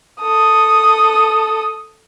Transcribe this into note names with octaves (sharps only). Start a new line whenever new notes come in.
A4 D#6